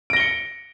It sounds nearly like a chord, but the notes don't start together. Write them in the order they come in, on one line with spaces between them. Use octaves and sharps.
D7 A#6 G7 C#7